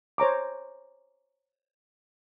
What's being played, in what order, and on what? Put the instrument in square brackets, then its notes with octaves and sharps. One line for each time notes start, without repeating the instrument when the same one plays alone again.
[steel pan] C5 C#5 A#5 D6